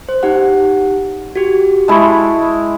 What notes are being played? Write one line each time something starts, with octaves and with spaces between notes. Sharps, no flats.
C5
D#4 G4 F#5
F#4 G4
G#3 E4 A5 B5 C#6